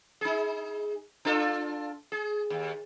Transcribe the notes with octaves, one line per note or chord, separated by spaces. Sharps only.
D#4 G#4
D4 F4 A4
G#4
D#2